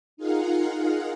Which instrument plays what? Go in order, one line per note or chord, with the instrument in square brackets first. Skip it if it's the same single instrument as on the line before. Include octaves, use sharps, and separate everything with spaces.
[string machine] D#4 F4 G#4 A#4 F5 F#5